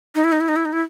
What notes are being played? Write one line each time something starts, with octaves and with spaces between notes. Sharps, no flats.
D#4
E4
D#4
E4
D#4
E4
D#4
E4